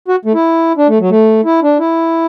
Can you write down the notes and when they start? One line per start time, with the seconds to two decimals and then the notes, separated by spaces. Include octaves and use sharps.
0.08 F#4
0.25 A3
0.34 E4
0.77 D4
0.88 A3
1.00 F#3
1.10 A3
1.45 E4
1.62 D4
1.79 E4